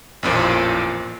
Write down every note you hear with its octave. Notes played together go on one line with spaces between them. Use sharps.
A1 F2 A#2 C5